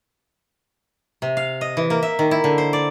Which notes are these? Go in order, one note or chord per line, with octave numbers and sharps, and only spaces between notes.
C3
F5
D#5
E3
A#3
E5
D#3
E4
D3
C5
D5